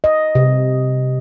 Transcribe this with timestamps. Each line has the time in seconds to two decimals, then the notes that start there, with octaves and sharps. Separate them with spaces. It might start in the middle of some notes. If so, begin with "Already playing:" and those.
0.04 D#5
0.35 C3